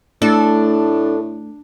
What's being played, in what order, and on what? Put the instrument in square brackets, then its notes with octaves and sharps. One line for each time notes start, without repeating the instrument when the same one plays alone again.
[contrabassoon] A2 [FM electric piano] A3 [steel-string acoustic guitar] D4 [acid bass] A4